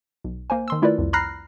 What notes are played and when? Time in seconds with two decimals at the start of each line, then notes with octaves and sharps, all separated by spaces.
0.25 B1
0.50 A#3 C5 G#5
0.68 D#3 C6 E6
0.82 A3 E4 F4 A#4 B4 D5
0.98 C2 F2
1.13 A#5 B5 F6 F#6 A#6 C7